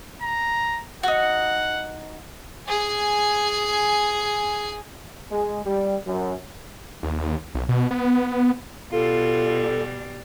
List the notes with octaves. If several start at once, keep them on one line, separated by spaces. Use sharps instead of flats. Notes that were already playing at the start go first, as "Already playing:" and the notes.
A#5
D#4 F#4 F#5
G#4 G#5
G#3
G3
F#2
D#2
B1
B2
B3
B2 G3 F4 A4